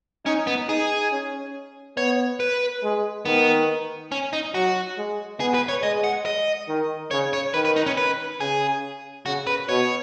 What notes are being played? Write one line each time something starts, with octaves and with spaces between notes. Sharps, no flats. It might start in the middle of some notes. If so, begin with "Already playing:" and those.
C#4 D#4
B3
D#4 G#4
C#4
B3 C#5
B4
G#3
D#3 B3
C#4
D#4
F#3 F#4
G#3
B3 G#4
B4
C#5
G#3 D#5
F#5
D#5
D#3
C#3 C#5
C#5
D#3 B4
B4
D#4
C#4
B4
C#3 G#4
C#3 F#4
B4
B2 C#5